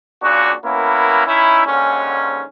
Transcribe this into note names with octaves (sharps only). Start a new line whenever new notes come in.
A#2 C#3 D4 F#4
A#3 B3 C#4 E4 A#4
C#4 D#4 E4
D#2 G#2 D3 C#4